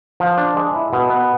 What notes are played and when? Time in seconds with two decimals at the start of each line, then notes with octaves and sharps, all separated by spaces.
0.20 F3
0.37 D4
0.56 G#3
0.75 E4
0.93 B2
1.10 B3